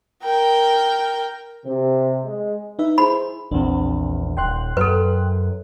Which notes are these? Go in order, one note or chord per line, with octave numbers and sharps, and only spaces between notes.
A#4 G5
C3
G#3
D#4 B4 E5
E4 G#4 C5 B5
A#1 E2 C4 D4
D#1 G5 C6 F#6
F#2 A4 B4